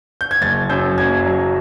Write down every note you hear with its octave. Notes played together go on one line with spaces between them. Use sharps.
G6
G#6
F#1 A6
F#2 G6
F#1 G#6
F#3